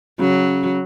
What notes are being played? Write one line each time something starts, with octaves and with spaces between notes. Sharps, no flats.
C#3 F#3